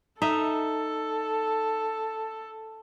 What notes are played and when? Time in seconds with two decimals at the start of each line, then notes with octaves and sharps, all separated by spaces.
0.22 D#4 A4 E5